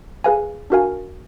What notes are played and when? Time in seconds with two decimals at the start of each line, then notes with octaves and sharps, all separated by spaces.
0.24 G#4 B4 F5 G#5
0.70 D4 F#4 A#4 F5 G#5